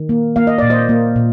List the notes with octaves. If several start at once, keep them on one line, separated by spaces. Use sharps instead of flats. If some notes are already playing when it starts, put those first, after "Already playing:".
Already playing: D#3
A#3
A#3 F5
D#5
A#2 D5
C5 D#5
A#3
A#2